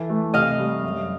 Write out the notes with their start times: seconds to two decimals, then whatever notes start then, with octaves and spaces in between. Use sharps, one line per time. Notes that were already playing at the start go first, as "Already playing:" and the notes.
Already playing: E3 A4
0.09 A3
0.34 C3 D#5 F5
0.59 G3
0.84 F#2